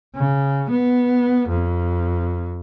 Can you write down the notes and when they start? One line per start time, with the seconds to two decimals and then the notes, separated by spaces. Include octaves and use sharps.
0.16 C#3
0.71 B3
1.49 F2